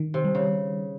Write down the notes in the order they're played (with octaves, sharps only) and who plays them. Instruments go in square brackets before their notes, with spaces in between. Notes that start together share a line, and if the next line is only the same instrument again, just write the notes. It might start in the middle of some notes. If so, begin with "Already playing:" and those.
Already playing: [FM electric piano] D#3
[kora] C3
[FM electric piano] G3
[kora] C#3